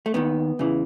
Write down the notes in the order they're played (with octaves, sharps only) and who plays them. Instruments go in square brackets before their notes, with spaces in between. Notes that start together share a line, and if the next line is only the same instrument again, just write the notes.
[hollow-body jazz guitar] A3
D#2 D#3 B3
E2 C#3 E3